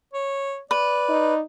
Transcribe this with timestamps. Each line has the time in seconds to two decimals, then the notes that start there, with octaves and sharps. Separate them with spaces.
0.13 C#5
0.71 B4 D5
1.09 D#4